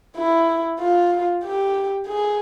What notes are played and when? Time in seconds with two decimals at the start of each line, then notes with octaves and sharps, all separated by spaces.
0.16 E4
0.80 F4
1.43 G4
2.08 G#4